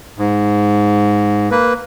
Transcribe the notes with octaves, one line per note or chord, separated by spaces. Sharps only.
G#2
A#3 B4